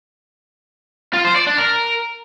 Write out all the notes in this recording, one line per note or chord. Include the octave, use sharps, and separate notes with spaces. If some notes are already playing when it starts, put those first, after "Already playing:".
F4
C5
D5
D4
A#4